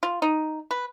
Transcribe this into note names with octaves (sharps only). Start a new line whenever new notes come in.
F4
D#4
B4